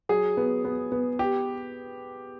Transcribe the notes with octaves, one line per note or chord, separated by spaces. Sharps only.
F#3 G#4
B3
B3
B3
G4